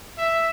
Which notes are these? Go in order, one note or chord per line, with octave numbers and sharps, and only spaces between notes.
E5